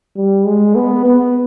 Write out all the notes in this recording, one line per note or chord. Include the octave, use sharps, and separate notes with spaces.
G3
G#3
B3
B3